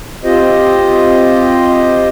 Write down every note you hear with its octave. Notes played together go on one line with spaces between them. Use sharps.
C4 F4 G4 C5 D#5